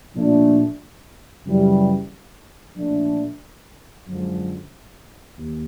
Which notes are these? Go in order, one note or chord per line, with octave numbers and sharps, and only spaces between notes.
A#2 F3 A3 D4
F#2 C#3 E3 G3
A#2 F3 A3 D4
F#2 D3 F3 G#3
D#2